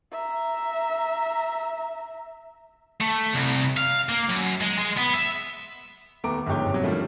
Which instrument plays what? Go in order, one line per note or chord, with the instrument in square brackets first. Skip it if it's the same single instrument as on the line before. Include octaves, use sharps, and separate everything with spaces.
[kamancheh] E5 A#5
[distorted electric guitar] A3
C2
F5
A#3
F#2
G#3
G#3
B3
E5
[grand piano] D#2 A3 B3 A#5 D6 D7
G1 G#2 F3 G4 C#5 G5
C3 F#3
D#3 F3 G3 A3 A#3 D4